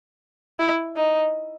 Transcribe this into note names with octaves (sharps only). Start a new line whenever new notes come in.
E4
D#4